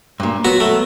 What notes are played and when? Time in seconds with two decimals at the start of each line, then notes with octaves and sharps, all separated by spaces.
0.20 G2 A#2
0.45 F#3 B3 F#4
0.60 A3